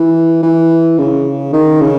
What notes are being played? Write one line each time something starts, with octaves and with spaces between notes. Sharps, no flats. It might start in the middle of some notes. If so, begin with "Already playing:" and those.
Already playing: E3
E3
C#3
D#3
C#3